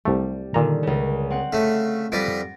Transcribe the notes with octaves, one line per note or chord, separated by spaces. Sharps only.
C2 G3 A3
A#2 D3 D#3 A#5
C#2 C#3
C4 F#5
C#3 A3
F2 G3 B4 A6 A#6 D7